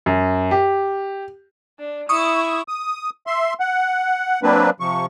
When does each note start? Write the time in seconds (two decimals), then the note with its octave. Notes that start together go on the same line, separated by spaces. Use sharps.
0.06 F#2
0.51 G4
1.79 D4
2.09 E4 C#6 D#6
2.68 D#6
3.27 E5 C6
3.60 F#5
4.43 F#3 A#3 C4 D4 B4
4.80 C3 F3 C#6